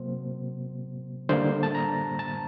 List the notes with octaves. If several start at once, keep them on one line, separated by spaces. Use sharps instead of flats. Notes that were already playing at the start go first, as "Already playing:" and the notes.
Already playing: C3 F#3 A#3 C5
D3 G3 A#3 C5
A5
A#5
A5